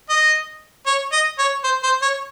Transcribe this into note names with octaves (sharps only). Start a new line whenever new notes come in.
D#5
C#5
D#5
C#5
C5
C5
C#5